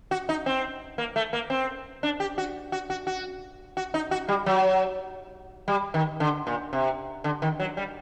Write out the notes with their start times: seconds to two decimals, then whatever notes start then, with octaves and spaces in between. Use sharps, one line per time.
0.11 F#4
0.29 D#4
0.46 C4
0.98 A#3
1.16 A3
1.33 A#3
1.50 C4
2.03 D4
2.20 G4
2.38 F#4
2.72 F#4
2.90 F#4
3.07 F#4
3.77 F#4
3.94 D#4
4.11 F#4
4.28 G3
4.46 F#3
5.68 G3
5.94 D#3
6.20 D3
6.47 A#2
6.73 C3
7.24 D3
7.42 D#3
7.60 F#3
7.77 G3